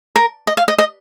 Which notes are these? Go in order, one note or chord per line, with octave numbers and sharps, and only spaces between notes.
A#4
D#5
F5
D#5
D#5